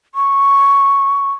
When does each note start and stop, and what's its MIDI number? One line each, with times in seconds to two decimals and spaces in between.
0.15 1.32 85